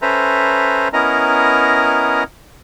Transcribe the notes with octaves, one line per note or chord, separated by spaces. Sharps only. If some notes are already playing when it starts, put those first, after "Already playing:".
C#4 A4 B4 C5 E5 A#5
B3 C#4 E4 A#4 D#5 A#5